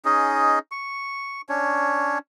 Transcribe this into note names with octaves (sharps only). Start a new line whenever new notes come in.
C#4 D#4 G#4 D#5
C#6
C#4 D4 C#5